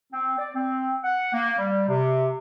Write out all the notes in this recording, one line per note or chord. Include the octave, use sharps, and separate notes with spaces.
C4
D5
C4
F#5
A#3
G3
C3